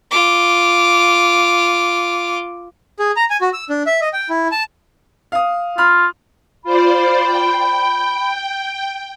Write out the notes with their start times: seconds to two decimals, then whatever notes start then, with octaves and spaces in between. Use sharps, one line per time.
0.11 F4 D6
2.99 G#4
3.16 A#5
3.30 G#5
3.41 F#4
3.53 E6
3.70 D4
3.86 E5
4.02 D#5
4.13 G5
4.29 E4
4.52 A5
5.32 F5 D#6
5.78 F4 B5 F6
6.64 F4 C5 D5 B5
7.25 G5